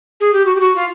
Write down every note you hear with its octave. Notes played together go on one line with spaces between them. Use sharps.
G#4
G4
F#4
G4
F#4
F4